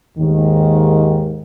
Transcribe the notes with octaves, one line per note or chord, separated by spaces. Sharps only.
D#2 G#2 D#3